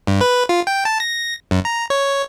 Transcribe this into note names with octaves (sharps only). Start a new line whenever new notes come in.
G2
B4
F4
G5
A5
A#6
F#2
A#5
C#5